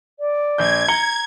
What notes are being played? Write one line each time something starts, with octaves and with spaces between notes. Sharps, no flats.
D5
A#1 G6 G#6
A#5 C#7 G7